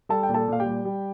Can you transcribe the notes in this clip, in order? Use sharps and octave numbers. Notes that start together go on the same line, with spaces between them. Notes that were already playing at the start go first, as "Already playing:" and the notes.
G3 A4 A5
G5
A#2
A4 A5
A#2 F5
G4 G5
G3
G3